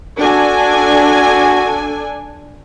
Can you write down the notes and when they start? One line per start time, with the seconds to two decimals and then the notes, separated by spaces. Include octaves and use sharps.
0.20 D4 F#4 A4 G#5